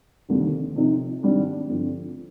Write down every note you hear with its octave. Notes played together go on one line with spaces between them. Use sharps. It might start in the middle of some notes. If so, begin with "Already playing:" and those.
F1 D#2 D3 G3
C3 F3 C4 D#4
G#1 G#2 G3 D4
G2 D3 F3 C4